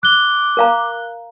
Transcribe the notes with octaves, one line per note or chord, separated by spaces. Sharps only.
D6 F#6 G7
A#4 F5 A#5